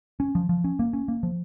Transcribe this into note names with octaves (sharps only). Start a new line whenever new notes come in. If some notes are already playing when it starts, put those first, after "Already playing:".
C#4
F3
F3
C#4
A#3
C#4
A#3
F3